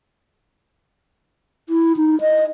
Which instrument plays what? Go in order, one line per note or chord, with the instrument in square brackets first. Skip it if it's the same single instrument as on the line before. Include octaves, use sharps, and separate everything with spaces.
[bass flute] E4
D#4
D#5